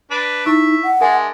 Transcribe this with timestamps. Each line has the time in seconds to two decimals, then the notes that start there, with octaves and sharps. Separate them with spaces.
0.11 D4 B4
0.46 D#4 E4 E5 C#6
0.83 F#5
1.01 G#3 D4 A#4 E5 G#5